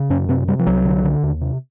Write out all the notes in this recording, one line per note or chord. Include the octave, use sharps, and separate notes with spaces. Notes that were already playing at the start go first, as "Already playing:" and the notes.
Already playing: C#3
F#2 C#4
C3 C4
C3 G3
F3
C2 F#3
D3
D3
D#2
C3